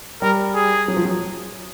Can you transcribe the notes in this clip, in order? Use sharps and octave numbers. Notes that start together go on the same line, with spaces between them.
G3 A#4
G#4
F#3
F3
F#3